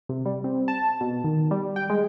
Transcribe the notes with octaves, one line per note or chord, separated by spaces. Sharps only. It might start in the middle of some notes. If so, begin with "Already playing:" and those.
C3
G3
C4
A5
B2
D#3
G3
G5
G#3